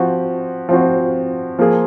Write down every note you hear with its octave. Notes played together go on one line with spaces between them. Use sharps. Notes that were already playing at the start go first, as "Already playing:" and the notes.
Already playing: F3 C4 F#4
F3 C4 F#4
F3 A#3 F4 G#4